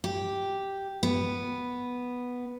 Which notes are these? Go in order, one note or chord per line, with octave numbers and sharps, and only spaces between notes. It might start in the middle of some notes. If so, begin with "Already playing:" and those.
G4
B3